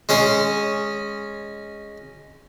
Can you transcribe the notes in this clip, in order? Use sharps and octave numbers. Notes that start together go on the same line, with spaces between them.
G#3 C#4 G#4